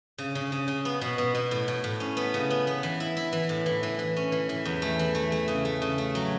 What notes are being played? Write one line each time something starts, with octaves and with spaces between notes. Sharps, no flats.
C#3
C#3
C#3
C#3
B3
B2
B2
B2
A2
A2
A2
C#4
B3
C#3
B3
B3
E3
E4
E4
E3
A2
E3
E3
E3
C#4
E3
E3
E2
A3
E3
A3
A3
C#3
A3
C#3
A3
F#3